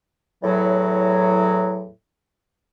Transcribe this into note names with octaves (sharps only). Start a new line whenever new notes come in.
E2 A2 F#3